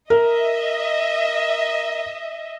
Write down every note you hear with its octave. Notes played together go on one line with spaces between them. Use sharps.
A#4 D#5 E5